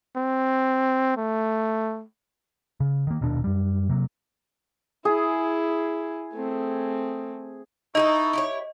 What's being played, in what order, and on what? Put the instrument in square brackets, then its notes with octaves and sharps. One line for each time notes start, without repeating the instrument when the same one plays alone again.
[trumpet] C4
A3
[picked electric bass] C#3
D#3 A#3
D#1 D#2 B2 D4
F#2 G3
C3 F#3 A#3
[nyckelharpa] E4 [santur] G#4
[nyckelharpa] A3 C4
[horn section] D#4 [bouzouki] E4 G#4 A4 [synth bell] D#5 [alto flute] C#6
[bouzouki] E4 G4 C#5